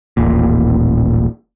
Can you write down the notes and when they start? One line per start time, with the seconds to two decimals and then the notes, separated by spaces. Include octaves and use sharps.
0.17 D#1 A1 A#2